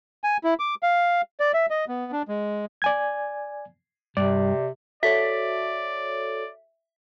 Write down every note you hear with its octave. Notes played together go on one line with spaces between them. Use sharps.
G#5
E4
D6
F5
D5
E5
D#5
B3
D4
G#3
D5 G#5 G#6
G2 C3 D5
F#4 A4 C#5 D5 E5 B6